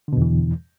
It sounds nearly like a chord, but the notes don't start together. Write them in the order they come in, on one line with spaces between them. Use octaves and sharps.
D3 B2 E2 E3